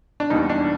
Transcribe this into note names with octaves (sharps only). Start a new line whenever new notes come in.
D4
E2 B2 G3 A#3 D#4
D4